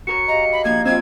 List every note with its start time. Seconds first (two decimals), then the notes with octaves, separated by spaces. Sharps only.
0.07 F#4 A#4 C#5 C#7
0.28 G4 D#5 F5 A#5
0.52 B5
0.65 F3 A#3 D4 G#6
0.85 C4 F4 D5 E6 G#6